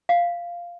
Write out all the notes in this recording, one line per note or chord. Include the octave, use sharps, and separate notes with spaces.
F5